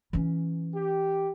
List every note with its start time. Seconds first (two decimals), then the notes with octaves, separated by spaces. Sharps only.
0.13 E3 C#4
0.75 G4